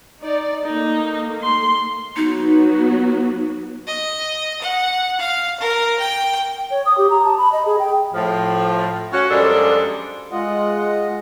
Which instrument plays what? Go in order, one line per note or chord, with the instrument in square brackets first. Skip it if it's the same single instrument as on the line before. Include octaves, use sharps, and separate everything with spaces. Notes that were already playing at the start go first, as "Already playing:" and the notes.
[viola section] D#4 D5
[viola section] A3 A#3 [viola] D#4
[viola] C6
[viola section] F#3 B3 F#4 [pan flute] D#4
[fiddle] D#5
F#5
F5
A#4
G5
[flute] G5
C#5
D#6
G4
A#5
A5
B5
D#5
G#4
G5
[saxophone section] A2 F3
C#4 F#4
F#2 F3 G3 G#3 D4 A4
[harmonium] G#3 F4 D#5 F#5